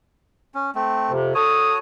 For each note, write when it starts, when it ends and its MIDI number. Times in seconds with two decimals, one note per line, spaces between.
0.54 0.71 61
0.75 1.12 57
0.75 1.12 60
1.10 1.34 41
1.10 1.34 48
1.35 1.78 66
1.35 1.75 69
1.35 1.78 73
1.35 1.75 87